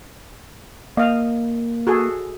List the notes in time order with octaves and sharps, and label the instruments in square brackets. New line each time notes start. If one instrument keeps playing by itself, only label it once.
[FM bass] A#3 [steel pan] D#5 F5
[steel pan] F#4 G#4 A4